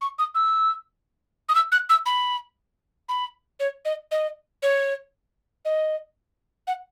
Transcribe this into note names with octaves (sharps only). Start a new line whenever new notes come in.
C#6
D#6
E6
D#6
E6
F#6
E6
B5
B5
C#5
D#5
D#5
C#5
D#5
F#5